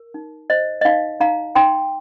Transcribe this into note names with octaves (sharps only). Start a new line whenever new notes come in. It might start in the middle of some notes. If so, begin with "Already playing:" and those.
Already playing: A#4
D#4
C5 D#5
D#5
D#4 F5
D#4 F5 A#5
D#4 G5 C6